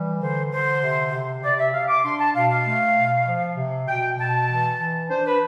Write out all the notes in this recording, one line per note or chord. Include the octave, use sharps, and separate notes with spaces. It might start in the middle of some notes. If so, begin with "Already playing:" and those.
Already playing: E3 G3
D3 C5
D3 C5
C3
C3
C3 D5
E5
C3 F5
D6
D4 C6
A5
B2 F5
F5
A3
B2
F3
C3
B2 G5
B2 A5
E3
E3
D4 C5
B4